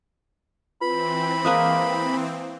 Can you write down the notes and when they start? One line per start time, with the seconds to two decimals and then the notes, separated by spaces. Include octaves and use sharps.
0.81 E3 C4 F4 B4 B5
1.45 G#3 A#3 B4 A#5 D#6